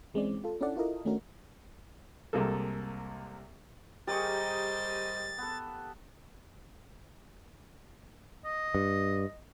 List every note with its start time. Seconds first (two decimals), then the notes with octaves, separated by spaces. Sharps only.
0.14 E3 G#3 C4 C#4 D5
0.44 F4 A4
0.61 C#4 D4 E4 A4 D5 F#5
0.76 E4 F4 A4 A#4 D#5
1.05 D#3 A3 C#4 D4 F#4 A#4
2.33 C2 C3 G#3 A#3 A4
4.07 G3 G4 G#4 A#4 C5 D#5 C#6 A6
5.38 B3 A4
8.45 D#5
8.75 G2